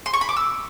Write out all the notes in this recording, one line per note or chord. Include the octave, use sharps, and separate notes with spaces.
C6
C#6
B5
D6
E6